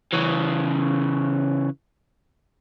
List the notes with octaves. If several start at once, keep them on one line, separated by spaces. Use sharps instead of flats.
C#3 E3